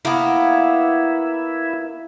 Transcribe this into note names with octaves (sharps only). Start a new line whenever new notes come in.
A#3 B3 E4